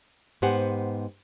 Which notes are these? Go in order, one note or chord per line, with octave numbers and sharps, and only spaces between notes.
G#2 B3 G4 C5 F#5 G#5